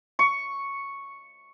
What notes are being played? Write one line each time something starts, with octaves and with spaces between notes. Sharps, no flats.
C#6